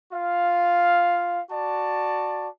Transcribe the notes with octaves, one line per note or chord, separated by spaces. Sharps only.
F4 F5
F#4 D5 A5